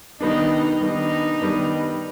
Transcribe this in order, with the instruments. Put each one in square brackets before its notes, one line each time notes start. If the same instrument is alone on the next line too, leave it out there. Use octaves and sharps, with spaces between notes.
[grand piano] D#3 G3 B3 D4 [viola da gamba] D#4
[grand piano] D#3 G3 B3 D4 [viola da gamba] D#4
[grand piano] D#3 G3 B3 D4